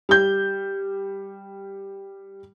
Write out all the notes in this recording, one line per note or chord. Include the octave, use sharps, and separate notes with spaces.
G3 G6